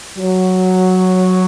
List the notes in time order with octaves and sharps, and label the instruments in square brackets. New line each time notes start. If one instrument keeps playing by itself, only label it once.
[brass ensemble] F#3